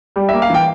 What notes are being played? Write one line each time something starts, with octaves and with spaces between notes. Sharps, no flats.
G3
E5
A#3
F5
E3 G5